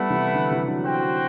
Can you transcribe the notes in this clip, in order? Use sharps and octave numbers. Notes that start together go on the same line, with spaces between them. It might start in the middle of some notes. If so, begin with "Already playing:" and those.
Already playing: G3 A3 B3 E4 B4 F#5
C3 E3
D3
C3 E3
D3 F#3
F#4 C5 G5